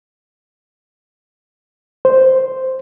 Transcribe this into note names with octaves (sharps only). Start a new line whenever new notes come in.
C5